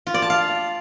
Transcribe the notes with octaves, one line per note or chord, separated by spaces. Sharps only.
F4
D5
A5
F5